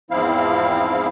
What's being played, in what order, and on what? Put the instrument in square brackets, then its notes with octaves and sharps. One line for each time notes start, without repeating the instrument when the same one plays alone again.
[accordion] E2 G#2 F3 C4 E4 F5